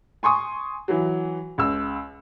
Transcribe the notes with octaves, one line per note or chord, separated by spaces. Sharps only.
G#5 C6 C#6 D#6
E3 F#3
C#2 E6